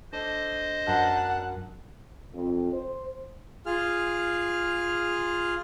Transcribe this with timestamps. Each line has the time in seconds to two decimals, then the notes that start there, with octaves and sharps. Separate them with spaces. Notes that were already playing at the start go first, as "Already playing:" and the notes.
0.12 D4 A4 C5 D#5
0.87 F#2 D4 A#4 F#5 A5
2.33 F2
2.72 C5
3.66 F4 G#4 F6